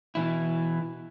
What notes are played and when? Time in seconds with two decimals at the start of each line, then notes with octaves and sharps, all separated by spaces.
0.15 B2 E3 E4